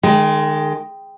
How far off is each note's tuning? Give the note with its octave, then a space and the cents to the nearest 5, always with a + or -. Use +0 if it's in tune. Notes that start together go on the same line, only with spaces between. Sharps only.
D#3 -35 G#3 +5 G5 +0